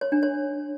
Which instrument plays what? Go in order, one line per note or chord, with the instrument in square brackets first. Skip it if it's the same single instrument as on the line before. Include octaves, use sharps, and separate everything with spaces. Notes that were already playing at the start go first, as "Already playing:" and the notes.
[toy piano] C#5
D4
C#5